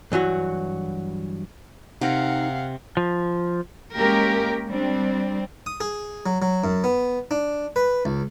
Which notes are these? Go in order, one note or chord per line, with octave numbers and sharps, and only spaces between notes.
G2 E3 F#3 F#4
C3 C4 D#4 A#4 F5 F#5
F3
G#3 A#3 C#4 G4 A#4
G3 C4 D4
D#6
G#4
F#3
F#3
F#2
B3
D4
B4
C#2